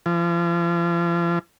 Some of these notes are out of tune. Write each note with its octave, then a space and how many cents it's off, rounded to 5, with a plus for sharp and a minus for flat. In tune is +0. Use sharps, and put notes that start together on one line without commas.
F3 -40